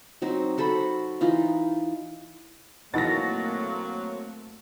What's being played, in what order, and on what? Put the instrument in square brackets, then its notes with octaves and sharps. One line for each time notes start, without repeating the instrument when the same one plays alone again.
[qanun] F#3 C4 D#4
F#4 A4 C5 B5
E3 D#4 F4
[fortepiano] B2 E3 [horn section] F#3 [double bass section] A3 A#3 C4 [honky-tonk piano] A6 A#6